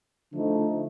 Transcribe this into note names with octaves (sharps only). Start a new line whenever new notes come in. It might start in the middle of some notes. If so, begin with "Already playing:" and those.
D3 F3 A3 D#4